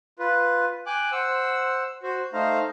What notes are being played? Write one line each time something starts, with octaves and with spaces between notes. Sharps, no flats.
F4 B4
G5 G#5 D6 F#6
C5 F#5 E6
F#4 C5
A3 D#4 C5 F5 A#5